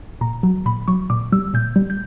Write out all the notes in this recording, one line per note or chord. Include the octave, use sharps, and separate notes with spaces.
A#2 A#5
F#3
A#2 B5
F#3 C#6
A#2 D6
G3 E6
A#2 G6
G3
G6